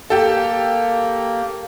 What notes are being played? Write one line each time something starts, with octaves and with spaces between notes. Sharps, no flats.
A#3 G4 A4